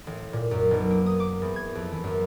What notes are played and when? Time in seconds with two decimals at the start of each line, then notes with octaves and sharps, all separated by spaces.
0.07 A1
0.33 A#2
0.51 F#2
0.71 B1
0.90 A#3
1.06 D#6
1.20 D6
1.42 E2
1.56 G#6
1.75 F2
1.92 E3
2.04 F#2